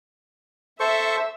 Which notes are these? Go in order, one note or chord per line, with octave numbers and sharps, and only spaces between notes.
A4 C5 E5 C#6